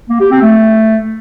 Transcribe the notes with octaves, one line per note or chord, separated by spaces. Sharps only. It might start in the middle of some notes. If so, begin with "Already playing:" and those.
A#3
G4
C4
A3